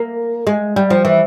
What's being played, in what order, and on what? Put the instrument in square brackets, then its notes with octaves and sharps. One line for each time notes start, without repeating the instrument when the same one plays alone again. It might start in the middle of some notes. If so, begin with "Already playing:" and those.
Already playing: [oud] A#3
G#3
G3
F3
E3